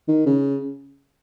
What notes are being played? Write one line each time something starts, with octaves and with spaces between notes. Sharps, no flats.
D#3
C#3